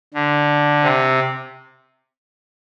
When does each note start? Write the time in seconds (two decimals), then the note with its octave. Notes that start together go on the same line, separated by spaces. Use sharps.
0.14 D3
0.83 C3